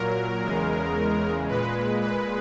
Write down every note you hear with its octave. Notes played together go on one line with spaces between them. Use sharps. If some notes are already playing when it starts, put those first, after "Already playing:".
Already playing: A#2 F#3 A#4
E2 C#3 G#3
A#2 G#3 B4
B4